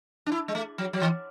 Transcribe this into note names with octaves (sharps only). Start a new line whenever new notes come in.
D4
E4
G#3
A3
F#3
F#3
E3